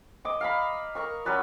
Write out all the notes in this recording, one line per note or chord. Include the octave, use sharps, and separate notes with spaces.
D#5 D6
F5 A#5 B5
A#4 A#5 C#6
F#3 C#4 B4 D5